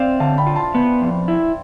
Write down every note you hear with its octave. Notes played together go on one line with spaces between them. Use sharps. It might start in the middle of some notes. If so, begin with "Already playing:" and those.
Already playing: C4 C5 D5 E5 F5
D3 F5 A5
G5 B5
F4
A5 C6
B3
F2
E4